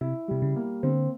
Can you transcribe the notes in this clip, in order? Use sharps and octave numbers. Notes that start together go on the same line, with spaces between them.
C3 E4
C3 G3
C#3
A#3
D3 C4